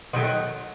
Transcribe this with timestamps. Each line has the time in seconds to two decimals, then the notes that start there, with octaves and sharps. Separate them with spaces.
0.13 D#3 F#3 A3 B3